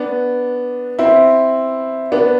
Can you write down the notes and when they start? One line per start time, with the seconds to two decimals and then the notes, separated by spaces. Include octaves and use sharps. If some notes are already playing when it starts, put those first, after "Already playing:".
Already playing: B3 D4
0.99 C4 E4
2.12 B3 D4